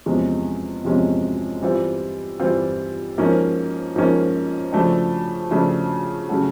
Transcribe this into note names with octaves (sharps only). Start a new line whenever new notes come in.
E2 C3 F3 G#3 C#4
E2 C3 F3 G#3 C#4
E3 G3 C4 F4
E3 G3 C4 F4
G#2 F3 A#3 C#4
G#2 F3 A#3 C#4
C#3 F3 A3 D4
C#3 F3 A3 D4
C#3 F#3 A3 C#4 F#4